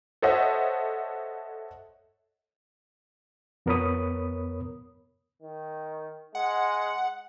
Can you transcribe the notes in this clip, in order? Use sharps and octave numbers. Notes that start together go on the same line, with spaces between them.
A4 C5 C#5 D#5 E5 F#5
F2 B3 A#4 C#5 B5 D#6
D#3
G#3 F#5